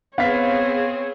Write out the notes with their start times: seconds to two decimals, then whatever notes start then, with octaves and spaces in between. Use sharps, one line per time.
0.18 B3 C4 G#4 C#5 F5 B6